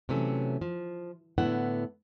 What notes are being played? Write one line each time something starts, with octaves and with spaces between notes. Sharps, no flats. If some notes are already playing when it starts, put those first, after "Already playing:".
C3 E3 F#3 A3 C#4
F3
A2 D3 B3 E4 F#5